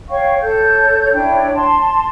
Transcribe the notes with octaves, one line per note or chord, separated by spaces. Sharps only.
C#5 F5 G5 C#6
A4 C#5 G6
D4 E4 C#5 G5
A5 C6